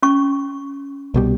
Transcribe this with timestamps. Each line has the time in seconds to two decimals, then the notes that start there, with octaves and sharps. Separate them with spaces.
0.02 C#4 C#6
1.14 C2 B2 G3